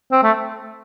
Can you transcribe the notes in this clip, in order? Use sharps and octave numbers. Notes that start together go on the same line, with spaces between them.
C4
A3